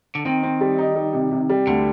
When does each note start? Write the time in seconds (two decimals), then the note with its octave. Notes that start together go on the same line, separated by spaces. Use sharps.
0.15 D3
0.25 D#3 C4
0.43 C4
0.61 G3
0.79 D#4
0.96 G3
1.13 C3
1.31 C3
1.49 G3
1.67 D2 D3